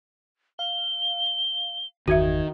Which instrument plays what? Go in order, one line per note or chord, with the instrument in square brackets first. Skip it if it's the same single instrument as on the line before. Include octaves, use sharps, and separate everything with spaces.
[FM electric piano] F5 [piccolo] G7
[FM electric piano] G1 E2 G#6 [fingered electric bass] D#3 [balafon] F#4 E5